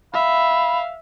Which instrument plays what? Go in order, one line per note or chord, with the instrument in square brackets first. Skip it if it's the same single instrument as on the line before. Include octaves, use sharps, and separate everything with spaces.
[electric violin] E5 [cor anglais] F5 [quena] B5